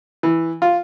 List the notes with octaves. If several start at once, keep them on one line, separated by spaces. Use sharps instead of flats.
E3
F4